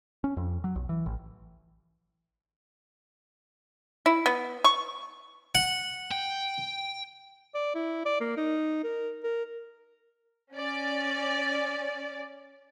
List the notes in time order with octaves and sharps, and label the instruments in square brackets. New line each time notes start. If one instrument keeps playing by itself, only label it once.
[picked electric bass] C#4
F2
F#3
B1
E3
A1
[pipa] E4
B3
C#6
[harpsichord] F#5
[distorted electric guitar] G5
[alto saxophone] D5
E4
D5
A#3
D#4
A#4
A#4
[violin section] C#4 D5